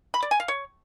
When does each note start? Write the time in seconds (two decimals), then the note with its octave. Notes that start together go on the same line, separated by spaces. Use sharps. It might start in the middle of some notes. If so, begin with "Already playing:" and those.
0.14 B5
0.23 D5
0.31 G#5
0.40 F5
0.48 C#5